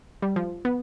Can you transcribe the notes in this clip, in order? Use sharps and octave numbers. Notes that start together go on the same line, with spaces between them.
G3
F3
B3